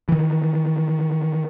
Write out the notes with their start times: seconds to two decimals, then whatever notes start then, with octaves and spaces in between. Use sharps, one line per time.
0.09 D#3 E3